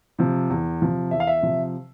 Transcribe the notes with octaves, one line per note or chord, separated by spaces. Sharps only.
C3 F3
E2
C3 F3
E2 E5
F5
E5
C3 F3